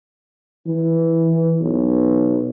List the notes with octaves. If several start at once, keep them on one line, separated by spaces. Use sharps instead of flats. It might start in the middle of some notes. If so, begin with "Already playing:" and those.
E3
B1